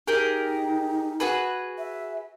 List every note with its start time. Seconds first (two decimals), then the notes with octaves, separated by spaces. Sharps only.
0.08 D#4 G4 G#4 A#4
1.20 F#4 G#4 B4
1.78 E5